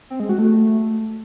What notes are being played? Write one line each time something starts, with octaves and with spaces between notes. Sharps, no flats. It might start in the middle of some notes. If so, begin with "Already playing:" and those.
C4
G#3
F#4
A3